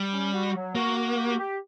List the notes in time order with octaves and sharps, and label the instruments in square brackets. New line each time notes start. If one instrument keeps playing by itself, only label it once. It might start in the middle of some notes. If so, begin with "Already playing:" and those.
Already playing: [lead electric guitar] G3
[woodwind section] C#4
F#4
F#3
[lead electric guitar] A#3 [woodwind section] F#4
[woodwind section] F#4
G4
G4